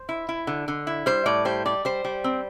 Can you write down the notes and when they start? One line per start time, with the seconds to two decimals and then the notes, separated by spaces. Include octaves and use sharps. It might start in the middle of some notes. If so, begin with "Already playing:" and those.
Already playing: C5
0.09 E4
0.29 E4
0.47 D3
0.68 D3
0.87 E4
1.06 G3 C5
1.26 A2 D5
1.45 G3 C5
1.66 G3 D5
1.85 G3 C5
2.05 G3
2.24 C4